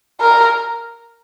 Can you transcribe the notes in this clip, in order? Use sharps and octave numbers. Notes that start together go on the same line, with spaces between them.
A#4